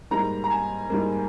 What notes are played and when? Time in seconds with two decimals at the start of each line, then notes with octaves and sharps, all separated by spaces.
0.11 G#2 G3 A#3 A#5
0.44 A#5
0.51 G#5
0.90 G#2 G3 A#3